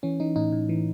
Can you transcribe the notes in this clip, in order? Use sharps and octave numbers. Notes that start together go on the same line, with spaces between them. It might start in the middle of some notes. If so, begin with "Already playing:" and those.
E3 C#4
E3 D#4
A2 D#4
A2
E3